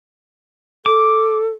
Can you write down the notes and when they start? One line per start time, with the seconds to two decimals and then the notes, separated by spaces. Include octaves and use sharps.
0.86 A4 D6